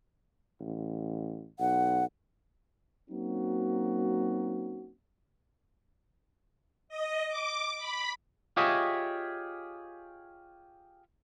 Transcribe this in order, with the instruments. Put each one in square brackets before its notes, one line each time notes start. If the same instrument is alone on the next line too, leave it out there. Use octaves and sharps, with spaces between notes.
[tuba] A1
[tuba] B1 [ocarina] F#5
[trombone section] F#3 A#3 C4 C#4 D#4 F#4
[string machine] D#5
D6
B5
[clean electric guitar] F4 G4 G#4 C#5 D#5 E5